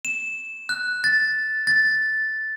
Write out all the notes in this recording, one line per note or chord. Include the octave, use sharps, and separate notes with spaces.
E7
F#6
A6
A6